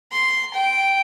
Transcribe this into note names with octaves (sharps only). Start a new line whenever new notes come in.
C6
G5